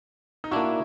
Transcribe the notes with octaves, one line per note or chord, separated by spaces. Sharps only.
D#4
A#3 D4 E4 F#4